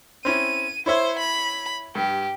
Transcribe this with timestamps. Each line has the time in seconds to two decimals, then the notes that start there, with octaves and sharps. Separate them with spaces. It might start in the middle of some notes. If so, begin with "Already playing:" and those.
0.25 C4 C#4 E4 D#7
0.86 E4 C5 C#5 E5
1.19 B5
1.95 G2 G4